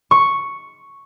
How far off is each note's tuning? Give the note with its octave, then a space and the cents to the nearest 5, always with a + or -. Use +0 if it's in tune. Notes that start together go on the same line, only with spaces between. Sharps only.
C#6 +0